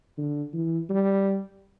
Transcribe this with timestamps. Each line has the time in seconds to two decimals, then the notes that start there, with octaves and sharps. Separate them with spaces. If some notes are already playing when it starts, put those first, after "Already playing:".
0.18 D3
0.54 E3
0.89 G3